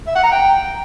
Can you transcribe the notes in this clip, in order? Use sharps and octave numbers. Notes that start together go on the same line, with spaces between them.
E5
F#5
A#5
G5